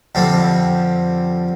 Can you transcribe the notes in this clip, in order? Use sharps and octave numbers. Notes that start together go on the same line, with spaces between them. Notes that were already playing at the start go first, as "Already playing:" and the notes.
F2 D3 G3 C4